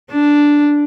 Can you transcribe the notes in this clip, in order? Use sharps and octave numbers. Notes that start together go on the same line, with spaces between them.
D4